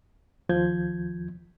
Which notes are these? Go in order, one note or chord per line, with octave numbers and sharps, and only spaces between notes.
D#2 F3 G6 G#6